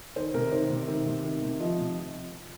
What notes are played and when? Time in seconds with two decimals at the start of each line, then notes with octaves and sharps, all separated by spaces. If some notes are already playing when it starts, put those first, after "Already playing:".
0.16 D#3 C5
0.34 C3 A#4
0.52 D#3 C5
0.70 C3
0.88 D#3
1.06 C3
1.25 D#3
1.42 C3
1.60 F3 D#5
1.78 C3